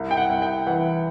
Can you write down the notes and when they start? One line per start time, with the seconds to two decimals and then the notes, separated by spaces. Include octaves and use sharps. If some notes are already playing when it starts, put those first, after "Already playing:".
Already playing: C2
0.11 G5
0.17 F#5
0.30 C2
0.42 G5
0.67 E3 F#5